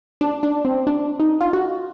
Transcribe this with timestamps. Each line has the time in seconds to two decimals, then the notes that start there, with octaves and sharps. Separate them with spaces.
0.21 D4
0.43 D4
0.65 C4
0.87 D4
1.20 D#4
1.41 F4
1.53 F#4